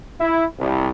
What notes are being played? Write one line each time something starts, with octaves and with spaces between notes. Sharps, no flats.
E4
C2